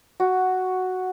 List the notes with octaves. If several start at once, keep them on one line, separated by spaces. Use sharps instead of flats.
F#4